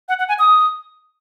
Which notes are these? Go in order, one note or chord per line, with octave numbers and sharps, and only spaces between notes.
F#5
F#5
G#5
D#6